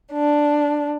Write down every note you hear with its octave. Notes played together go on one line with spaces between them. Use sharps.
D4